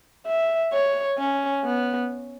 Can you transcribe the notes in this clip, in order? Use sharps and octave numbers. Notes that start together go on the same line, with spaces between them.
E5
C#5
C#4
B3